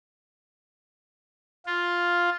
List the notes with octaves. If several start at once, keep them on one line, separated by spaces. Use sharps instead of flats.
F4